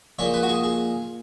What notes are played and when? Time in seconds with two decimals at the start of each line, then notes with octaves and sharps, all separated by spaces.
0.19 A#2 F3 G#3 C#5
0.34 B4
0.43 F#4
0.49 G#4
0.63 G#4